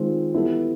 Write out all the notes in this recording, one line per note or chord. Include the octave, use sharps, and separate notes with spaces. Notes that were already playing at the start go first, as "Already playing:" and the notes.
Already playing: D#3 G#3 C4 F4
E3 G3 B3 E4 A4